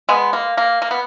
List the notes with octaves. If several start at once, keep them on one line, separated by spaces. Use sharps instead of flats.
G#3 B3
A#3
A#3
A#3
B3